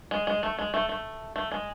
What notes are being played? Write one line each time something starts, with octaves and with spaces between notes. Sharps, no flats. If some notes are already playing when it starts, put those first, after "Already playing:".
G#3
G#3
A3
G#3
A3
A3
A3
G#3